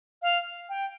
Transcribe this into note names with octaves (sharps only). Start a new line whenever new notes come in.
F5
G5